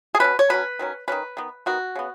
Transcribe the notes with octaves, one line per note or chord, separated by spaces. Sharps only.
G#4
B2 F#3 C#4 B4
C#5
B2 F#3 C#4 B4
D#3 F#3 C#4
D#3 F#3 C#4 B4
D#3 B3
D#3 B3 F#4
C#3 B3